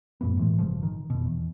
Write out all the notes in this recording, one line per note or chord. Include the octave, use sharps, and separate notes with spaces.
F#2 A#2 A3 B3
A2 E3 G#3
G1 C#3 F3
D#3
F1 B2
E2